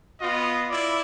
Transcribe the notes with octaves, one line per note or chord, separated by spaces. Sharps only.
B3 F4 D#5
E4 D5